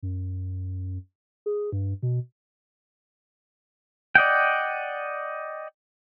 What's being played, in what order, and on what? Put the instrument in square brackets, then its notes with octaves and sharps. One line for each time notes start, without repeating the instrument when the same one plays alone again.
[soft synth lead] F#2
G#4
G2
B2
[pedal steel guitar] D5 D#5 F#5 G5